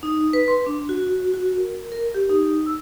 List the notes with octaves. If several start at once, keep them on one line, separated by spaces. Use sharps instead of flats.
D#4
B4
C6
D4
F#4
F#4
A#4
A#4
G4
D#4
E6